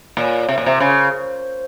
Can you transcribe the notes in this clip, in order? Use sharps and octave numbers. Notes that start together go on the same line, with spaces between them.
A#2 C#5
C3
A#2
C3 C5
C#3